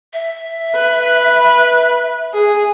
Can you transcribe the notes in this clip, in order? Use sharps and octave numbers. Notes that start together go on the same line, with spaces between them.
E5
B4
G#4